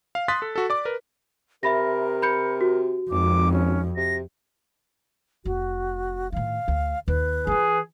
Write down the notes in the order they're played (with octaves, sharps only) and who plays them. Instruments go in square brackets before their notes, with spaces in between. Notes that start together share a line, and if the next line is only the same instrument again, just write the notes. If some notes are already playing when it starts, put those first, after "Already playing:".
[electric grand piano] F5
C6 D#6 F#6 A6 B6
A4
F#4 A4
D5 D6
A#4 B4
[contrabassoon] C3 [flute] A#4 [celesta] E5 B5 A#6
[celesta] B5 G6 C#7
F#4
[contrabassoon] G#1 [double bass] F2 [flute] D6
[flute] C#4
[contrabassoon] C3 [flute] A#6
[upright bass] F1 [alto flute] F#4
[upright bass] A2 D#3 [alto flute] F5
[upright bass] D2
[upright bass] D#2 [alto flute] B4
[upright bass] E3 F4 [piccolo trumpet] G#4